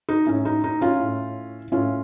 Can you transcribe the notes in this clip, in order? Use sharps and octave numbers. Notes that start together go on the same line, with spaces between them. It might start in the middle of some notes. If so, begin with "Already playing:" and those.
D#4
A2 C#4
D#4
D#4
C#4 F4
A2
A2 C#4 F4